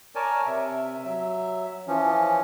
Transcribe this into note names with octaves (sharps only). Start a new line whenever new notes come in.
A#4 C#5 D5 G#5 A5
C3 E5
F#3 E5
E3 F3 C#4